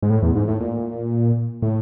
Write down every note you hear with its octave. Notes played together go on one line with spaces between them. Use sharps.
G#2
A2
E2
G#2
A2
A#2
A2